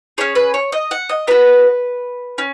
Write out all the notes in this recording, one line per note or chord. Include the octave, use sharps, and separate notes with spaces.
C#4 G#4 C#5
B4
C#5
D#5
F#5
D#5
B3 F#4 B4
C#4